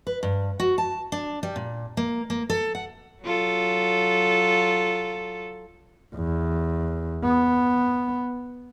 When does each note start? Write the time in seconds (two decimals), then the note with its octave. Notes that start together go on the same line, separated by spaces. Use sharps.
0.07 B4
0.23 G2
0.60 F#4
0.78 A5
1.12 D4
1.43 G3
1.56 A#2
1.97 A#3
2.30 A#3
2.50 A4
2.75 F#5
3.23 F#3 F4 A4
6.16 E2
7.25 B3